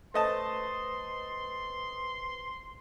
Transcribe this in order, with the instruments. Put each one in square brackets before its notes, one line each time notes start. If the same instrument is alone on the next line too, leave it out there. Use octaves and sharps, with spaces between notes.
[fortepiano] A3 D#5 A5 [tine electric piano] B4 C5 [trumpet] C6